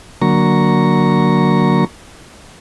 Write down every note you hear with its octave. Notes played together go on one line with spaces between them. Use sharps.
D3 F#3 A#3 A#5 C#6